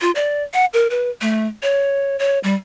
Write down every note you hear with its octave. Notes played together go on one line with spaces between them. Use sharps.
F4
D5
F#5
A#4
B4
A3
C#5
C#5
G3